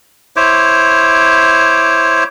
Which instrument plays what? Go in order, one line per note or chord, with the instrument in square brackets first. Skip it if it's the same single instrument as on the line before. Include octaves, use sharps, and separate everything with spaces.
[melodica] E4 C5 C#5 D6